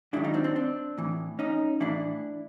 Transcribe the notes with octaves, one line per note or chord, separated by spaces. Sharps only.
G#2 D#3 F#3 D4 E4
D#4 F4
C4 D4
C4 D4
C4 D4
A2 E3
C#4 D#4
A2 E3 D4 E4